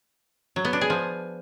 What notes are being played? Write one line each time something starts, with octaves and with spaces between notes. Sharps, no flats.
F#3
B3
D4
G#4
F3